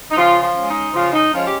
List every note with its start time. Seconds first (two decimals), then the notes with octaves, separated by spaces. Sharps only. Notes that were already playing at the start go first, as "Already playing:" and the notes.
0.11 D#4
0.17 C#3 F3 F4
0.42 F3 F4
0.55 G#3 C#4
0.68 D#4
0.93 C#3 F3 F4
1.13 D#4
1.33 F3 G#3 C#4 F4
1.45 G4